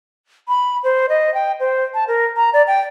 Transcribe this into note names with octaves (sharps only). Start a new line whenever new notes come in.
B5
C5
D#5
G5
C5
A5
A#4
A#5
D5
G5